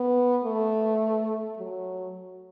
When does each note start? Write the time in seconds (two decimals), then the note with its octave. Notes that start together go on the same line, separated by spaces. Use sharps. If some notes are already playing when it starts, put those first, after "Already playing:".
Already playing: B3
0.45 A3
1.58 F#3